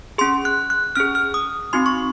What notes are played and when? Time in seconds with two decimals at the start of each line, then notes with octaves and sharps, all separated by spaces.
0.18 C#4 G#4 C6
0.45 F#6
0.70 F#6
0.96 C#4 G#4 F6
1.15 F6
1.34 D#6
1.73 C4 D#4 F#4 C6
1.86 C#6